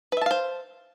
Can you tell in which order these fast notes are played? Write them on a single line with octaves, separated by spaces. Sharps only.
B4 E5 A5 F5 C5